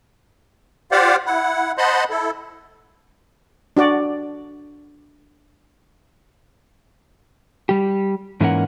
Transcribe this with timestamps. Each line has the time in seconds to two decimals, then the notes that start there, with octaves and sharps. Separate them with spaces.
0.91 F4 G4 C5 D5 F5 F#5
1.26 E4 F#5
1.78 C5 D#5 F#5 A5 B5 C6
2.10 E4 A4
3.77 D4 F#4 D5
7.69 G3 G4
8.41 G#2 E3 A#3 C#4 A#4 F#5